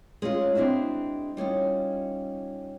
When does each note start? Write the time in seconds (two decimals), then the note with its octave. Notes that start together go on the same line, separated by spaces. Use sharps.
0.22 G#3 C#4 D#4 F4 G#4
0.55 G#3 C4 D4 E4 F#4
1.37 G3 C#4 D#4 F4